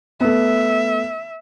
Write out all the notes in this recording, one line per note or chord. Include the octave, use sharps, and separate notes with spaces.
A3 B3 E5